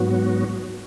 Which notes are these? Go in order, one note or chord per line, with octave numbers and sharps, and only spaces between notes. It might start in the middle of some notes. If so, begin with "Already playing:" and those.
Already playing: G#2 F#3 B3 F#4